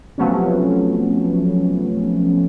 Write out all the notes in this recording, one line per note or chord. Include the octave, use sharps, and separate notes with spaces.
C3 F3 F#3 A3 B3 C#4